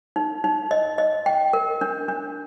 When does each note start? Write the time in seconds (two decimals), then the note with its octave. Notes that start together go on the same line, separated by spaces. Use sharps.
0.16 D#4
0.44 D#4
0.71 D#5
0.98 D#5
1.26 G5
1.53 A#4
1.81 D4
2.08 D4